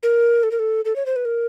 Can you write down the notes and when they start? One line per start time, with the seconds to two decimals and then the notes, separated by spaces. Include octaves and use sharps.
0.03 A#4
0.43 A4
0.51 A#4
0.59 A4
0.85 A4
0.96 C#5
1.06 C5
1.16 B4
1.25 A#4